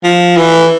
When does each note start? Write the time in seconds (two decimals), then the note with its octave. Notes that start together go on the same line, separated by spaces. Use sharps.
0.04 F3
0.37 E3